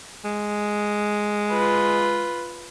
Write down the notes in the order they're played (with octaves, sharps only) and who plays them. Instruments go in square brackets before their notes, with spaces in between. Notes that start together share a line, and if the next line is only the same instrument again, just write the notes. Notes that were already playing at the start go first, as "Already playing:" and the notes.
[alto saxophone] G#3
[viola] F4 B4